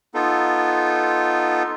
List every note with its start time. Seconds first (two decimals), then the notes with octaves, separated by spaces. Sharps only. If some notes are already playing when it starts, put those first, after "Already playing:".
0.14 B3 D#4 F4 A4